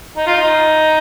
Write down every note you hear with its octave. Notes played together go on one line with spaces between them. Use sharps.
D#4
F4
D#4